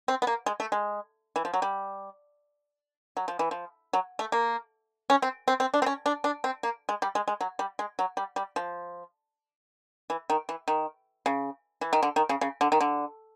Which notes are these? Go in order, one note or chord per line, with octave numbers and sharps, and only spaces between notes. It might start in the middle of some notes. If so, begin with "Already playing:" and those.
C4
B3
A#3
G#3
A3
G#3
E3
F3
F#3
G3
F#3
F3
E3
F3
F#3
A3
A#3
C#4
C4
C4
C4
D4
C4
C#4
D4
D4
C4
A#3
G#3
G3
G#3
G#3
F#3
G3
G#3
F#3
G3
G3
F3
E3
D#3
E3
D#3
C#3
E3
D#3
D3
D#3
C#3
C#3
D3
D#3
D3